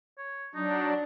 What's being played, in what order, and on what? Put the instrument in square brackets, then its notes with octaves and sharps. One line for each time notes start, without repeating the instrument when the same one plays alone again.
[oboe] C#5
[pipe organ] F#3 D4 [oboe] D#4